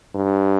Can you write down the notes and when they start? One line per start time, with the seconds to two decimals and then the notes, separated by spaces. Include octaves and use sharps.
0.15 G2